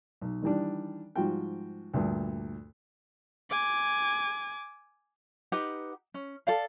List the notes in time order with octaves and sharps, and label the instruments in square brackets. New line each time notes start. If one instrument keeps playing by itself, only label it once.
[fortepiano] B1
D#3 E3 G3 D4
G#2 F3 G3 F4 F#4 G5
D2 G2 A#2
[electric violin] G#5 D6
[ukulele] D#4 G4 B4 F#5
C#4
A4 D5 F5